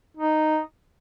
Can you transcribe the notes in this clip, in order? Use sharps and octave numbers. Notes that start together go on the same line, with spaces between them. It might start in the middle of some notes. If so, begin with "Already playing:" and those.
D#4